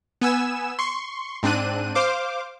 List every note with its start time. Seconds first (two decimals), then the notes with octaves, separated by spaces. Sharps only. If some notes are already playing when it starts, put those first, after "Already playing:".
0.21 B3 G#5 E6 E7
0.79 C6 C#6
1.43 G#2 C4 D4 F#6 D#7
1.95 C5 F5 D6